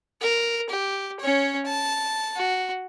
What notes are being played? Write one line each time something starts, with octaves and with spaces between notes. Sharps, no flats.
A#4
G4
C#4 C#5
A5
F#4